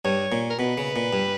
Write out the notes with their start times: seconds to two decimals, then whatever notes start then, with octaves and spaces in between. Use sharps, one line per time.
0.05 G2 C#5
0.32 A#2
0.50 A#4
0.59 B2 B4
0.78 C#3
0.96 A#2
1.13 G2